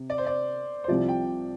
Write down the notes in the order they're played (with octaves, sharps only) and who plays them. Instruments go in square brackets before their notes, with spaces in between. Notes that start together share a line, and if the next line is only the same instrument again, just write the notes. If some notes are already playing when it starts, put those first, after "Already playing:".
Already playing: [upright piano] C3
[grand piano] D5
C5
D5
C5
[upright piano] C2 C3 F3 [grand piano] D5
[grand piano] G5